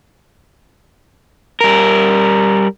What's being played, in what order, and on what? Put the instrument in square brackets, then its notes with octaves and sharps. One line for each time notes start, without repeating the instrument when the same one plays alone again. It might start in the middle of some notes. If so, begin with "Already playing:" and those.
[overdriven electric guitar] G3 A#4